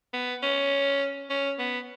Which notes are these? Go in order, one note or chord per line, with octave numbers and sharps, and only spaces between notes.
B3
C#4
C#4
B3